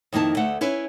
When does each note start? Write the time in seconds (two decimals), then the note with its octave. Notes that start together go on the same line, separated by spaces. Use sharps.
0.12 F2 D#3 A#3 E4 A5
0.37 D2 A3 F#5
0.61 C#4 E4 B4